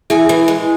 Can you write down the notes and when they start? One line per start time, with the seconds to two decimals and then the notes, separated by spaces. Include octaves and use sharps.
0.10 E3 G#4 G#5
0.29 E3
0.48 G#3